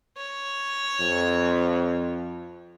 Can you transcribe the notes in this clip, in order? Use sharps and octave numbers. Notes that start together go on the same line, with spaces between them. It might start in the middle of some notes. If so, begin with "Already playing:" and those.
C#5
F2